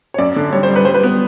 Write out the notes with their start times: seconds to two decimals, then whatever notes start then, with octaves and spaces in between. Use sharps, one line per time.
0.14 C#5
0.18 F#2 D5
0.36 D3
0.53 G3 C#5
0.63 C5
0.69 G3
0.76 B4
0.85 G3 C5
0.94 B4
1.03 B3